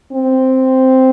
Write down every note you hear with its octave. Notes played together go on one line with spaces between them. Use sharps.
C4